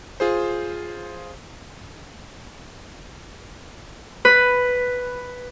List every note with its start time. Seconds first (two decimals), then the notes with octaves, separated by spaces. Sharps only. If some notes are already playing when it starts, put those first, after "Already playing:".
0.20 F4 G#4 C5
4.25 B4